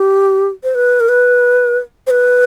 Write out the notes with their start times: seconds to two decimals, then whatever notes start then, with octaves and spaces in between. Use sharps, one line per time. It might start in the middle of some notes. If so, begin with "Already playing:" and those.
Already playing: G4
0.63 C5
0.75 B4
1.00 A#4
1.08 B4
2.07 C5
2.10 B4